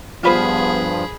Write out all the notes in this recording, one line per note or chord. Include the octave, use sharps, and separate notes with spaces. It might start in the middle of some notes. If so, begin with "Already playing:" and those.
G2 F3 B3 F4 G#4 B4 C5 B5